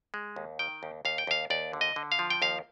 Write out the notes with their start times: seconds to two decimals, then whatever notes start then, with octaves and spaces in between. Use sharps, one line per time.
0.14 G#3
0.36 D#2
0.59 D#3 G5
0.83 D#2
1.05 D#2 F5
1.18 G5
1.27 D#2 F5
1.50 D#2 D5
1.73 D3
1.81 D#5
1.96 D3
2.12 F5
2.19 F3
2.30 G5
2.42 D#2 F5